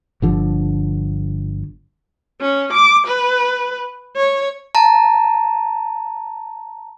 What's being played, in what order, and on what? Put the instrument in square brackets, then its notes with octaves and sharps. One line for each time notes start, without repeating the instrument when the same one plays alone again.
[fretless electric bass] G1 D3 F3
[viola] C#4
D6
B4
C#5
[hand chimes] A5 A#5